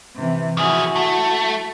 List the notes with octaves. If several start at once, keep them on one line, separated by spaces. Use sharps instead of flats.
C3 E3
F3 E4 F#4 G#4
A3